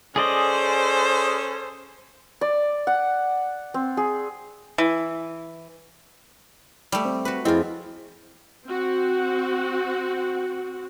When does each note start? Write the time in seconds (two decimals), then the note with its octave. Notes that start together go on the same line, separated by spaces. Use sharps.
0.16 C#4 G#4 A4 C5 D5 D#5
2.41 D5
2.87 F#5
3.74 C4
3.97 G#4
4.78 E3
6.92 G3 A3
7.05 C4
7.25 F#4 B4
7.45 F2 F3 C4 E4 F4 G#4 D#5
8.67 C4 F#4